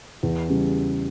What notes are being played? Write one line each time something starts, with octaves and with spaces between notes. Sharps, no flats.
E2
C#3 G3